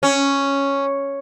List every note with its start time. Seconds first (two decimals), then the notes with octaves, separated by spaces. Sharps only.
0.03 C#4